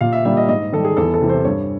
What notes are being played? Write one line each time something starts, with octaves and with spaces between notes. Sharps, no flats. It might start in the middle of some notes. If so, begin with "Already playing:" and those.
A#2 F5
E5
G3 A#3 D4 E5
D#5
G#2 D#5
D#3 G3 A4
G#4
E2 A4
A4
C3 E3
C5
G2 C#5